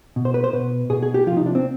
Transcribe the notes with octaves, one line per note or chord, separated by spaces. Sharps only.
B2
C5
B4
C5
B2 B4
B2 G#4
G#4
G4
C3 F3 F4
D#4
D4
C4